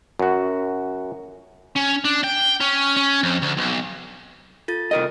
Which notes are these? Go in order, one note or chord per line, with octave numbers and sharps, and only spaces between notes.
F#2 F#4
C#4
D4
G5
C#4
C#4
F2
D2
B1
F4 A4 A6
C2 A#4 D#5